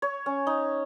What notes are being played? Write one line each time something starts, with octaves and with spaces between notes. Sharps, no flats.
C#5
C#4
D#4